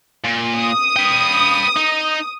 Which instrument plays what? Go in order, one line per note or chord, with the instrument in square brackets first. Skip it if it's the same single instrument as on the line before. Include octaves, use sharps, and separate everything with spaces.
[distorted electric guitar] A#2
[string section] D#6
[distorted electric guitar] B4 G5
D#4